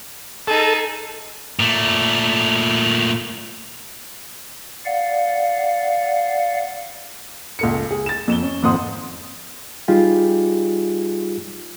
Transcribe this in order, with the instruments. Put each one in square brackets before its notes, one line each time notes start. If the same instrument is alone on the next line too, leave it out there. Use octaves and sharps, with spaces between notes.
[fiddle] D#4 G#4 [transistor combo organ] A4
[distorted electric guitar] A#2 A3
[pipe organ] D5 F5 F#5
[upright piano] C#2 A4 C#7
G#4
A6 E7
F2 E7 G7
C#4
G#1 F2 C4 F#5 C6 D#6
[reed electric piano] G3 D#4 F4 G4 G#4